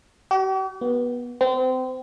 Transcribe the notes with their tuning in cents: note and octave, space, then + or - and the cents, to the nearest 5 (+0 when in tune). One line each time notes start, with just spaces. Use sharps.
G4 -45
B3 -20
C4 -30